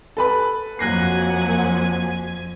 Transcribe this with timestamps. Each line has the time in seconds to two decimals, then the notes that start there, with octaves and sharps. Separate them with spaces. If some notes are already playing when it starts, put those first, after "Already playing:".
0.17 A4 B4 B5
0.79 F2 F#3 A#3 F#5 G#5 F#6 A#6 C7